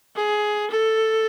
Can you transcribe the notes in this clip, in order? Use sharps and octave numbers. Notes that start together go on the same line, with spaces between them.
G#4
A4